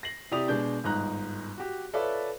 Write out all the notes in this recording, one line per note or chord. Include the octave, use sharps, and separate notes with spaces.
A#6 C7 F#7
C3 E4 G4 D5 D#6 F7
B2 G#3 D4 G6
G1 G#2 D#4 A#5 F#6
F#4 G4
F4 A4 B4 C#5 D5 E5